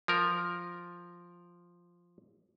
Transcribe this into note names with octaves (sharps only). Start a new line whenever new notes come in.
F3 A#4